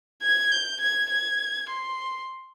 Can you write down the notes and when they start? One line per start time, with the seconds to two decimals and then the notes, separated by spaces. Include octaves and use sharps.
0.22 G#6
0.52 G6
0.81 G#6
1.11 G#6
1.70 C6